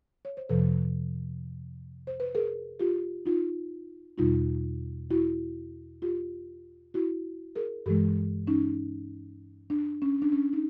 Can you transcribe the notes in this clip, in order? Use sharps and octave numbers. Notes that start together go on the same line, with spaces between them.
C#5
C5
F2 C3 F3 A4 B4
C5
B4
G#4 A#4
F4 G4
D#4 F4
E2 B2 G3 D#4 F4
E4 F#4
F4 G4
E4 F#4
G#4 A#4
G2 E3 G#3 G4 A4
C#4 D#4
D4
C#4
D4
C#4
D#4